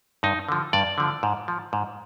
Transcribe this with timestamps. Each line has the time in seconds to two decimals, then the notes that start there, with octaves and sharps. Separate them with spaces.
0.23 G2 D#4
0.49 D3 F3
0.73 G2 D5
0.98 D3 F3
1.23 G#2
1.48 F3
1.73 G#2